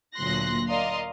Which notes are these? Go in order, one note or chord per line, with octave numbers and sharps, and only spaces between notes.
D2 A#2 F#3 C6 F#6 A#6
A#4 D5 D#5 F5 C6